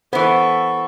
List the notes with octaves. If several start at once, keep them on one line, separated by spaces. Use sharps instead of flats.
E3 B3 A4 C5 C#6